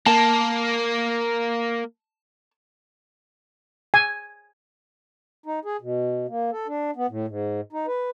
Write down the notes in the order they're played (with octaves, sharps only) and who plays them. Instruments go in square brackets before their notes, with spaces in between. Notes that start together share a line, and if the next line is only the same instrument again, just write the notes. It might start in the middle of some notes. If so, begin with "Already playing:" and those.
[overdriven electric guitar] A#3 [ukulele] A5
[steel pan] G#5
[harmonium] D#4
G#4
B2
A#3
A4
D4
B3
A2
G#2
D#4
B4